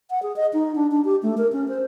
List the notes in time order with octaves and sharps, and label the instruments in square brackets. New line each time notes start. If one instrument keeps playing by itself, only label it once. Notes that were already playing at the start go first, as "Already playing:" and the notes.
[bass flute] F#5
G#4
D#5
D#4
D4
D4
G4
A3
A#4
C#4
C5